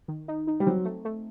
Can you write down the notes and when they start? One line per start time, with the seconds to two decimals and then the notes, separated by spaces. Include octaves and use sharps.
0.08 D#3
0.28 D#4
0.47 D#4
0.60 G3
0.66 F#3 C4
0.85 A3
1.05 A3